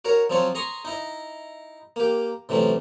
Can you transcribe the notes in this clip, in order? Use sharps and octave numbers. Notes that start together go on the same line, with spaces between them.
F#4 A#4 C#5
F3 F#3 C4 F4 C#5
G#4 A#5 C6 C#6 D#6
D#4 E4 D#5
A#3 G4
A2 C3 E3 F#3 A3 C#4